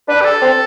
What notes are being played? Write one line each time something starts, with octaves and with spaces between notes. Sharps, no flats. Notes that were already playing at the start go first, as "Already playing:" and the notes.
D4 B4
G4
A4
C4